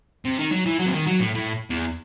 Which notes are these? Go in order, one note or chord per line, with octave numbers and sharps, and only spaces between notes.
C3
D#3
F#3
E3
F#3
C3
D#3
F#3
A2
A2
E2